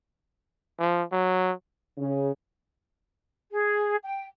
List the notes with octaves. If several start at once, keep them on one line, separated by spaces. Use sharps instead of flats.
F3
F#3
C#3
G#4
G5